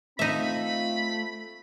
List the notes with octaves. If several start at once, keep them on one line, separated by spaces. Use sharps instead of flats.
A3 C4 D#4 F4 E5 B5